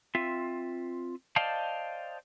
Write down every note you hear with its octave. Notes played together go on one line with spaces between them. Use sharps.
C4 F4 E5
C5 D5 D#5 F5 G5 A5